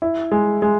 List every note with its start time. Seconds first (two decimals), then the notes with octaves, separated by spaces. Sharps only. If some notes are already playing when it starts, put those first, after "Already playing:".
0.02 E4
0.32 G#3
0.62 G#3